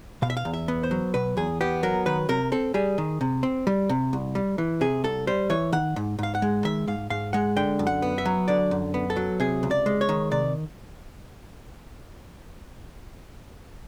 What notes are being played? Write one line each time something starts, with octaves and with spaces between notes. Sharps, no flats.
B2 F5
E5
F5
E2
E5
B3
C5
F#3
B2 B4
E2 G#4
B3 G4
F#3 A#4
D#3 B4
C3 A#4
C4 A4
G3 G#4
D#3
C3
C4
G3
C3
C2
G3
E3
C3 G#4
C2 A4
G3 C5
E3 C#5
D#3 F#5
G#2
G#2 F5
F#5
G#3
D#3 E5
G#2 F5
G#2 F5
G#3 F#5
D3 G5
F#2
F#5
B3
E5
F#3
D3 D5
F#2
B3
A4
F#3
C3 G#4
C#2
D5
G#3
C#5
D#3
C3 D5